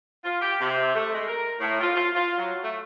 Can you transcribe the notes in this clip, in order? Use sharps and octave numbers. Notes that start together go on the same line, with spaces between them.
F4
G4
C3
A3
G#3
A#4
A2
F4
F4
F4
F#3
A3